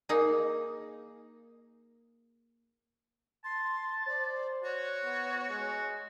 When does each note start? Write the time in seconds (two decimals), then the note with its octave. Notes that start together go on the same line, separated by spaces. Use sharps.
0.09 A#3 D#4 G#4
3.44 A5 C6
4.07 C5 D5
4.64 F#4 C#5
5.03 B3
5.49 G#3 F#4